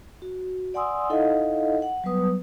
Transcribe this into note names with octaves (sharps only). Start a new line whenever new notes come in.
F#4
D5 F#5 G#5 C6 D#6 E6
D#4 E4 A4 D#5 F5 F#5
F#5
F#3 G3 B3 B4 D#6